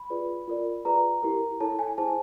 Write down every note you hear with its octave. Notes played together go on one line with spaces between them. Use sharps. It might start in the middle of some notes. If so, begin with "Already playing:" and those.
Already playing: B5
F4 G#4 B4 D5
F4 A#4 D5
F4 G#4 B4 D5 A#5
E4 G4 A#4
E4 A4 C#5 A5
G#5
E4 G#4 C5 A5